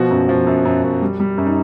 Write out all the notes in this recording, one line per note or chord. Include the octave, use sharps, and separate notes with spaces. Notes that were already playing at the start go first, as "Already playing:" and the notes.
Already playing: B2 F3 F#4
F#2
F3
F#2
F#2
F#2
G3
G3
F#2
D#4